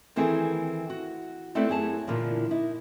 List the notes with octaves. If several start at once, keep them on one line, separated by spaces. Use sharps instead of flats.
D#3 E3 C4 G#4 A4 B4
F#4
A3 C4 E4 A4 B4 D5
F#2 E4 G4 G#4 G#5 A5
A#2 D3 E3 F3 A#3
D#4 E4